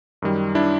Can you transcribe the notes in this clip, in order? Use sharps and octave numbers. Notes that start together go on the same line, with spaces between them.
F#2 D#3 G3
D4 E4